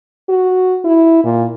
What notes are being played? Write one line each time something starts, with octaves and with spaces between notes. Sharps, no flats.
F#4
E4
A#2